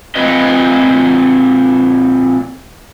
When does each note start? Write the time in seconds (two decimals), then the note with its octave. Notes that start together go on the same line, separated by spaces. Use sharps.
0.15 A#2 C4 F4 B4 D#5